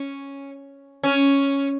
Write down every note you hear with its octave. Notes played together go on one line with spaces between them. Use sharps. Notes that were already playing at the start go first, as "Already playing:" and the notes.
Already playing: C#4
C#4